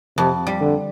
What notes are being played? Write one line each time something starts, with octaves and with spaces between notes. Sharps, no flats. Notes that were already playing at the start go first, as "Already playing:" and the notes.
F2 C3
G3
D3